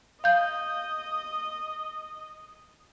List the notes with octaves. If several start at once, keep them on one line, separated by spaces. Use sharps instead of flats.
D#5 F5 G6